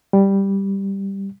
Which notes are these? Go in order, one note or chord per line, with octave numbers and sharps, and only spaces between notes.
G3